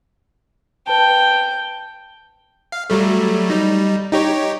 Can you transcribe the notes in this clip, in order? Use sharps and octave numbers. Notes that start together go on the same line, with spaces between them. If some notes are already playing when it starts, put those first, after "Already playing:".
B4 G5 A5
F5
F#3 G3 A3
G3 D#4
D#4 G4 C#5